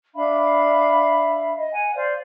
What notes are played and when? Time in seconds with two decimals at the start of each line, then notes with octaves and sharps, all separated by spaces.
0.15 D4 E5 F5 B5
1.56 D#5
1.73 F#5 G#5
1.95 C5 D5 F5